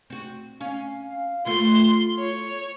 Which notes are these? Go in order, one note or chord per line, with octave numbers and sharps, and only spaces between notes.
C4 F#4
C#4 F5
A3 B3 F4 C6
C#5